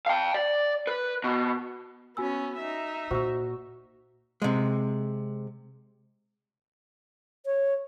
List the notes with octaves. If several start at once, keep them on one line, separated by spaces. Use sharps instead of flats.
F5 G5
D5
B4
B2
B3 C#4 F#4 G#5 E6
D#4 E5
A#2 F#4 C5 E6
C3 G#3
C#5